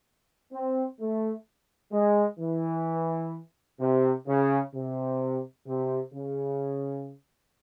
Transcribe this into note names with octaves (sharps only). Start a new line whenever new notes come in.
C4
A3
G#3
E3
C3
C#3
C3
C3
C#3